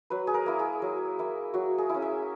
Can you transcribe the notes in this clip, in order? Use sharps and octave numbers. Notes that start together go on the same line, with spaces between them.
F#3 B4
G#4
A#4
A#3 E4
G#4
F#3
A#3 E4
F#3 F#4
G#4
C#4 E4
E5